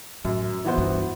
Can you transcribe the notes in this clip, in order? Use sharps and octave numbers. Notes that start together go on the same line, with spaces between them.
F#2 A2
E3 B3 F#4 C5
G2